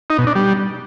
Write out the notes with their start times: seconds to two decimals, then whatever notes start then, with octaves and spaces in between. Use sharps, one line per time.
0.10 D#4
0.18 B2
0.27 D4
0.35 G3